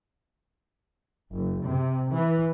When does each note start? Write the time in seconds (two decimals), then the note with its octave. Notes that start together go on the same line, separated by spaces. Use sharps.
1.33 F#1
1.66 C3
2.14 E3